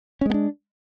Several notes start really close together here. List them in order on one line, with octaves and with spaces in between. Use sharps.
C#4 G#3 B3 D4